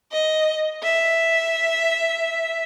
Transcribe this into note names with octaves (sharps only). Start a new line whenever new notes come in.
D#5
E5